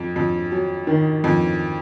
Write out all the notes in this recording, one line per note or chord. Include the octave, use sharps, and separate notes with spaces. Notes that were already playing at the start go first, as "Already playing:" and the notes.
Already playing: F2
F2
F#3
D#3
F2